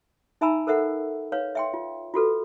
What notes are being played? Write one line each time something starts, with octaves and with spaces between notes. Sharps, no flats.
D#4 E5 G#5 A#5 B5 E6
A4 A#4 C5 E5 F#5
B4 C#5 F5
E5 G5 C6
F4
F4 F#4 A4 B4